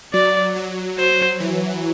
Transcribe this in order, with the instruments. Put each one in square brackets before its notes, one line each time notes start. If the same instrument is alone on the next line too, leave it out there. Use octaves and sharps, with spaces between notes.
[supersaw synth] F#3 [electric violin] D5
[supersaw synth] F#3
[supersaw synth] F#3 [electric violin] C5
[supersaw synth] E3